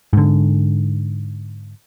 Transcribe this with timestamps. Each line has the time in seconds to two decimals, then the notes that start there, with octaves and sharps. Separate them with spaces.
0.13 G#2 D3